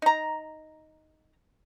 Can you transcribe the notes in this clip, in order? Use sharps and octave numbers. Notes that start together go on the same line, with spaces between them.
D#4 A#5